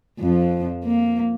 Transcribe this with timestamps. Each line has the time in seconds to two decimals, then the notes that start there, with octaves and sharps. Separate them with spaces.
0.20 F2 F3
0.85 A#3